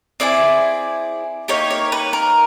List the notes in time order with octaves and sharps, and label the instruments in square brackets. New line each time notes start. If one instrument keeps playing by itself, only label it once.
[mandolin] C4 E4 G#4 D5
A#3 D#4 G4 C#5
C#5
B4
A#4